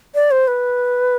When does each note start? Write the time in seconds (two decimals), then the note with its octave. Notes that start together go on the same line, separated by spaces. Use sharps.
0.15 D5
0.31 C5
0.48 B4